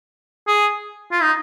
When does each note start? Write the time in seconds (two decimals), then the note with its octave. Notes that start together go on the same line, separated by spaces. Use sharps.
0.48 G#4
1.12 F4
1.22 D#4